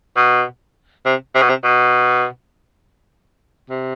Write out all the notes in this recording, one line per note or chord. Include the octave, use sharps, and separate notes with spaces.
B2
C3
C3
B2
C3
B2
C3